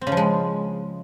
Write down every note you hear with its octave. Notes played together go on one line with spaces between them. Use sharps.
C4
C#3
F3
G#3